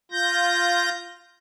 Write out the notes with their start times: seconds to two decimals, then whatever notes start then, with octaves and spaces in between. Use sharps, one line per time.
0.11 F4 G6 A#6